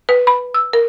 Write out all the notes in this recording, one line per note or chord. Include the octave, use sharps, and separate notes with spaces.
B4
B5
E6
A#4